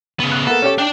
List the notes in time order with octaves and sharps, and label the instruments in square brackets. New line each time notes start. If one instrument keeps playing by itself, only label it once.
[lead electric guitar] C#3 B3
[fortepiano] F#6
[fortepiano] A#3 B3 [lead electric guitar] A4
[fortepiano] C#4 G4 C#5
[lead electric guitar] D4 D5 [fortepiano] G5